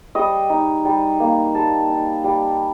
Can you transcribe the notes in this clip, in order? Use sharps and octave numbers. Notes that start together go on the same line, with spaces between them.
G3 D#5
D#4
G3
A#3
G3 A5
D#4
G3